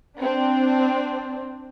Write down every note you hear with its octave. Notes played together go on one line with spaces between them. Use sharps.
C4 D4